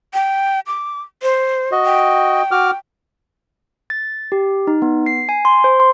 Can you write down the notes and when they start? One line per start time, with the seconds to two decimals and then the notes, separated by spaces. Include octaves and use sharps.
0.14 G5
0.67 D6
1.23 C5
1.72 F#4 D#5
1.85 G5
2.51 F#4 D6 F6
3.90 A6
4.32 G4
4.67 D#4
4.82 B3
5.06 C7
5.29 G#5
5.45 C6
5.64 C5
5.80 C6